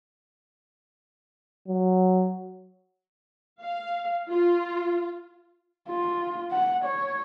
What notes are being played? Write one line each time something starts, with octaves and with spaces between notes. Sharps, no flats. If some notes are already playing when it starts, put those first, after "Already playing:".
F#3
F5
F4
F4
F#5
C#5